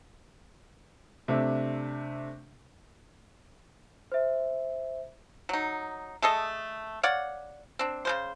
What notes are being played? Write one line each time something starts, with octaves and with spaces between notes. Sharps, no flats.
C3 A3 D4 E5
C5 E5
F#3 D#4
A3 G#4 A4 D#5
C#5 D5 F5 F#5
C4 D4
C#3 G#3 C5